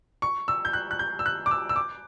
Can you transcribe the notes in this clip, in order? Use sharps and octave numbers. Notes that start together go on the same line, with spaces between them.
C#6
E6
G6
F#6
F#6
G6
E6
F#6
D6
E6
E6
D6